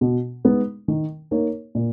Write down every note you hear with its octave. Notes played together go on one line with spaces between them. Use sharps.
B2
G#3 B3 D#4
D#3
A#3 D#4 A#4 C#5
A#2